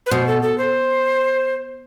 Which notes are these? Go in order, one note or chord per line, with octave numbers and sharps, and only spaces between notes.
B4
B2 C5
A4
A4
C5